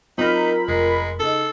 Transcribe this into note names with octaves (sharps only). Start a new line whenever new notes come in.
F#3 C4 D#4 F4 A#4 B5
F1 G#3
C#3 D#4 A4